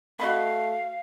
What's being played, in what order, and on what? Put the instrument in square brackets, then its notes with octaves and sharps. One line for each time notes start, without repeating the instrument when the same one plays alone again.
[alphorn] A3 [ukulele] F#4 D#5 B5 [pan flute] F5